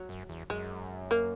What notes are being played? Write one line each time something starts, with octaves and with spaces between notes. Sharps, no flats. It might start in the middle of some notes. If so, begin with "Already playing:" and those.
Already playing: F#3
F#2
E2
F#2 G#3
A#3